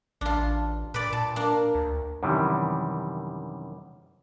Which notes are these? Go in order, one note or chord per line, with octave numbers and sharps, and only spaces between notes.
A1 D4 F4
A#2 B4 D5
A#2 A5
A#3 D4
D2
F#2 C3 D#3 E3 G3